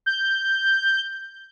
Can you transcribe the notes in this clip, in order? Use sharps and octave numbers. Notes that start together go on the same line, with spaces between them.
G6